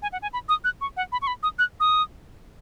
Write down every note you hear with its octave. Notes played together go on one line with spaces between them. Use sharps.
G#5
F#5
G#5
B5
D#6
F#6
C#6
F#5
B5
C#6
B5
D#6
F#6
D#6